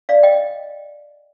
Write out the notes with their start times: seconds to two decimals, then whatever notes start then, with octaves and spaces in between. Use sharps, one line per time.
0.09 D5 F5
0.23 D#5 G5